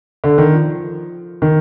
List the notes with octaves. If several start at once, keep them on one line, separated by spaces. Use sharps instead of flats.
D3
D#3
F3
D#3